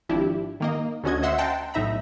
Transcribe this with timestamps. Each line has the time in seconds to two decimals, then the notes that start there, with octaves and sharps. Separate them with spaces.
0.09 G#1 F3 D4 E4 G4
0.60 D#3 A#3 D#5
1.04 D2 D3 C#4 F#4 D#5 G#6
1.23 C5 D#5 E5 F#5 C6 E6
1.38 F#5 G5 A5 A#5 C6
1.74 B1 A2 D#4 E5 A#5 B5